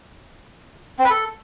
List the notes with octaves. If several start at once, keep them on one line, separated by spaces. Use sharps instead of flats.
C4
B4
A4